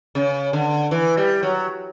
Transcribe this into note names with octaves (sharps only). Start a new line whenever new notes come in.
C#3
D3
E3
G3
F#3